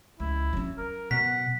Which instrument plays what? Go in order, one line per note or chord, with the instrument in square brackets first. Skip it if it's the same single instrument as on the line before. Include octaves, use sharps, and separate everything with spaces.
[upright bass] C#2 [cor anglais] E4
[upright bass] F#3 C#4
[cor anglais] A#4
[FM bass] B2 [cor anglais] F#5 [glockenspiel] B6